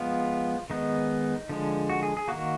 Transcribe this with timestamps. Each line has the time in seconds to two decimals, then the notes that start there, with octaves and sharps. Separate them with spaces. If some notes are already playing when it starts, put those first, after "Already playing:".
Already playing: F3 G#3 B3 F4
0.70 D#3 G#3 B3 D#4
1.49 D3 F3 G#3
1.89 F#4
2.03 G#4
2.17 G#4
2.28 D#3 A#3 F#4